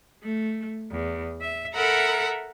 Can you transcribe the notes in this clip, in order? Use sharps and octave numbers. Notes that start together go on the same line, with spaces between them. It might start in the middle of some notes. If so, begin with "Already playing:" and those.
A3
E2
E5
A4 A#4 E5 F#5 A#5 B5